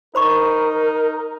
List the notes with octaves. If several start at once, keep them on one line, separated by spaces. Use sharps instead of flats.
D#4 A#4 C5 B5 C#6